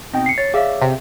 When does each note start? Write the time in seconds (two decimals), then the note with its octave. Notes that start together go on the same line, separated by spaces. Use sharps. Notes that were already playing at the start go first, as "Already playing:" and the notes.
0.13 B2 C4 D#4 G5
0.26 C7 C#7
0.38 C#5 A6
0.54 G#4 C#5 D5 E5 F5 D6
0.82 C3